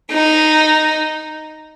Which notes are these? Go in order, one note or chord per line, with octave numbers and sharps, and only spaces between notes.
D#4